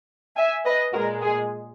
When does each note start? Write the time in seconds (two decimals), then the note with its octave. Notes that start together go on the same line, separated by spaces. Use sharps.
0.36 E5 G#5
0.65 B4 D#5
0.93 A#2 G#3 F#4 A#4
1.22 G#4